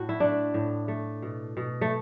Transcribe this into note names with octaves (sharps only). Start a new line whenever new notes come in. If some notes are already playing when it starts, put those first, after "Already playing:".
Already playing: A2 F#4
E4
A3 D4
A2
A3
B2
B2
A3